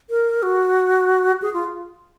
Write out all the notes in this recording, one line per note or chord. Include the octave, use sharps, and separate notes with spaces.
A#4
F#4
G#4
F4